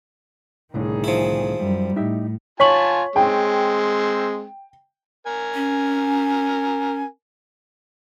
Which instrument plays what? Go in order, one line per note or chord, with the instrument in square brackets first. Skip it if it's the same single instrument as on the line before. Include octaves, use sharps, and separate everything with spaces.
[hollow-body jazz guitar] C2 A2 D3 [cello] D#3 G#4
[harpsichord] F3 E4
[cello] F#2 G3
[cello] A2 [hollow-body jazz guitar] D#4 G4 E5
[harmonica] F4 G#5 A5 [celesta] C#5 C#6 F#7 [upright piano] B6
[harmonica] G#3 C4 [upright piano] G5
[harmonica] A#4 G#5
[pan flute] C#4